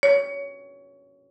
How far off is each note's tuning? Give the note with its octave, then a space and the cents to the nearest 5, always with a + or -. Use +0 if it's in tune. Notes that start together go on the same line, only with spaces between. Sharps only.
C#5 +20